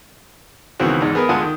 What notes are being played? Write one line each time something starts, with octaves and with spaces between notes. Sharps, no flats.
C#2 D#3 E3 B3 C4 F#4
E2 G#2
B3 G#4 A#4 B4
D2 G#3 F4 F#5 G#5 A5
D#3